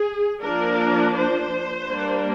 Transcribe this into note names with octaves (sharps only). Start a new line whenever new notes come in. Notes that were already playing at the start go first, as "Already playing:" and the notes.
Already playing: G#4
F3 A#3 D4 A#4
C5
G3 A#3 D4